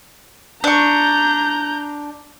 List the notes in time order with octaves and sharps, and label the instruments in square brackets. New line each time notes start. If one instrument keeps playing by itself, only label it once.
[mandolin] D4 C#6 [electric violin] A#5 G6